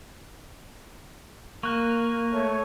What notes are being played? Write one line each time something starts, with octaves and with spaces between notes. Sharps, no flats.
A#3 C#6 F#6
A3 C#5